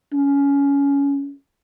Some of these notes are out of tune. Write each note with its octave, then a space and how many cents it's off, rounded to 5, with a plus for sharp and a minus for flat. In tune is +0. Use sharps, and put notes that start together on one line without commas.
C#4 +20